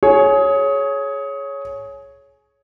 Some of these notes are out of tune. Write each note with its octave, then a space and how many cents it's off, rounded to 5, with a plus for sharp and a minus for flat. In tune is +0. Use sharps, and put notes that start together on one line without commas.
G#4 +20 C#5 +0